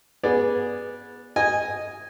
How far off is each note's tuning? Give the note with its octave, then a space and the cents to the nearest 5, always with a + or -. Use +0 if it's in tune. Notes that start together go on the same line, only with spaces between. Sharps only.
B3 -20 G#4 -5 D5 +0
D#5 +0 G#5 -10